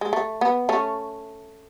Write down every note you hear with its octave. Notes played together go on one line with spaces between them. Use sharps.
G#3
A3
B3
A3 C#4